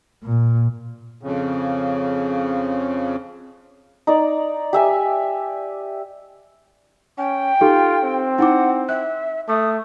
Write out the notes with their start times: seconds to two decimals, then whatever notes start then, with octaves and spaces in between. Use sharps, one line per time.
0.24 A#2
1.23 F2 C#3
4.07 D#4 D5
4.73 G4 E5 G#5
7.18 C#4 G5
7.61 D#4 F4 G4 A4
8.04 C4
8.39 D#4 E4 F#5 D6
8.89 E5 F#6
9.48 A3 D#6